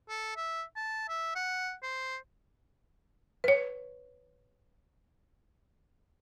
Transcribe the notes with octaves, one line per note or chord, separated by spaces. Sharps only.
A4
E5
A5
E5
F#5
C5
B4 C#5